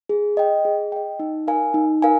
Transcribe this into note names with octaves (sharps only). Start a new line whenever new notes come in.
G#4
D#5 G5
G#4
D#5 G5
D#4
A#4 F5 G#5
D#4
A#4 F5 G#5